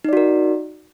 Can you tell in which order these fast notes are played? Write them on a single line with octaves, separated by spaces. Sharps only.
D#4 D5 F#4 A#4